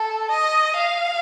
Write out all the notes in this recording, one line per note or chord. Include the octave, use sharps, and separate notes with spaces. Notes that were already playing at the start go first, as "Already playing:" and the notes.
Already playing: A4
D#5
F5